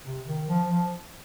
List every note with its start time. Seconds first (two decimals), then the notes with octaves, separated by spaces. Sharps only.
0.06 C3
0.26 D#3
0.48 F3
0.69 F3